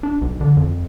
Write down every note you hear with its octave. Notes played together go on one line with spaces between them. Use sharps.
D4
B1
D3
F2